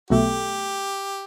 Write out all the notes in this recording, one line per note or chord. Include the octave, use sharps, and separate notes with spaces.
B1 B2 A3 G4